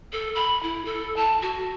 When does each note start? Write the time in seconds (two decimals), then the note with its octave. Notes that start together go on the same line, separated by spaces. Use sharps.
0.13 A4
0.35 B5
0.63 E4
0.85 A4
1.16 A5
1.42 F#4